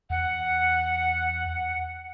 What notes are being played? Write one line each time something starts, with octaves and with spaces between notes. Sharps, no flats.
E2 F#5